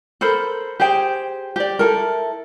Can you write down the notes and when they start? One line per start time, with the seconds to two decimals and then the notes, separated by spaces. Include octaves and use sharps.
0.21 A4 A#4 C5 B5
0.80 G4 G#4 C5 G5
1.56 G4 D5
1.79 E4 A4 A#4